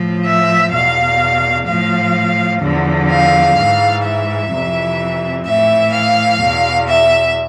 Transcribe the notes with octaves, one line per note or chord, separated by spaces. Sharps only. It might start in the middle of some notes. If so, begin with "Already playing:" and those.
Already playing: A2 F3
E5
E2 B2 F5
A2 F3 F5
E2 D3 F3
F5
G#2 E3
E5
F2 C3 E3
A2 E3 E5
F5
E2 B2
E5